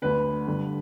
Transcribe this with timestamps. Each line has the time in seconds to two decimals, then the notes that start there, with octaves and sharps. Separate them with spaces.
0.02 D2 D3 B4
0.47 G2 D3